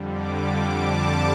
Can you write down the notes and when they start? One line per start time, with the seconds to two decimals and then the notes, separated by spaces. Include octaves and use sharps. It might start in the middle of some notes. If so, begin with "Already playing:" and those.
Already playing: F2 D3 G3
0.13 D6
0.42 D6
0.71 A5